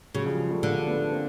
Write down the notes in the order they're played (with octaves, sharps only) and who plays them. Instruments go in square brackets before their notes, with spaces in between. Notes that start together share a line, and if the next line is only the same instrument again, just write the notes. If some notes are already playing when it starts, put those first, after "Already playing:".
[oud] C#3 [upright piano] F#3 G#3
[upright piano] F3 G3
F3
G3 A3
[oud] D3 [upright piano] G#3 A#3
[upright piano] A3 B3
A#3 C4